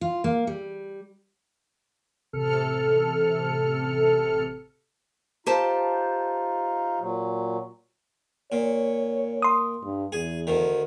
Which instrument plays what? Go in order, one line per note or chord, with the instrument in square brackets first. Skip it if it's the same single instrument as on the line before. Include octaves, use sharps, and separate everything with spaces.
[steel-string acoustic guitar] F4
A#3
G3
[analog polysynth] A1 C3 A4 F6 C#7
[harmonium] D#4 F4 [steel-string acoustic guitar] G4 C5 A5
[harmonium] A#2 F#3
[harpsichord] A#2 [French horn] C#5
[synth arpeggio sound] C6 D#6
[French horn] G2
[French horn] E2 [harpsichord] G#4
[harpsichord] D2 D#3